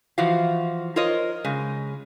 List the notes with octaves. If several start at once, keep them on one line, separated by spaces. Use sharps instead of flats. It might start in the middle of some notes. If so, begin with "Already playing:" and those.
E3 F3 F#4 F5
F4 A#4 C5 C#5 D#5
C#3 G#3